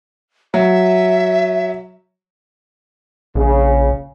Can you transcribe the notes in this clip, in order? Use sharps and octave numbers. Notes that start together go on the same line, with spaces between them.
F#3 E5
A#1 C#3